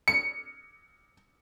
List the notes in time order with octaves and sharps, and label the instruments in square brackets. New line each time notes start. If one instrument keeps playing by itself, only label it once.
[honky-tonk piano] C#7